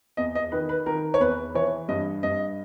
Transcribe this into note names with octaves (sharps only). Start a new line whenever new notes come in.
E2 D#5
D#5
D#3 B4
B4
D#3 A#4
C#5
E2 B4
E3 C#5
G2 D#5
G2 D#5